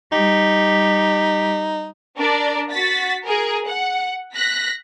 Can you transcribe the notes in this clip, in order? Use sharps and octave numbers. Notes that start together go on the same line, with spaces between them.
G3 D#4 G4
D4 A#4 D5
F#4 A6 B6
G#4 A#4
F#5
F#6 A#6 B6